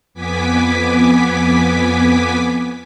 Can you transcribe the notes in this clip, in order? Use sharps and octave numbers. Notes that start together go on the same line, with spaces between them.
F2 B3 G#5 D6 B6